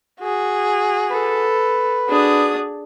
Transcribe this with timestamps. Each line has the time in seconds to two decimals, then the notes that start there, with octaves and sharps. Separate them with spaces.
0.20 F#4 G#4
1.11 A4 B4
2.09 D4 F#4 G#4 D#6